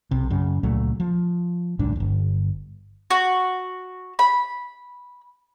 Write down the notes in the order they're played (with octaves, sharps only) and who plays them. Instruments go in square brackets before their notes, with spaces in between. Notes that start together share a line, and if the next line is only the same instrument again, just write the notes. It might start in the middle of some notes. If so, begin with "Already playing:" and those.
[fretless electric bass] B1 C3
F#2 C#3
C#2 A#2 F#3 A3
F3
D1 B1 G#2 D4
D1 G1
[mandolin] F#4
B5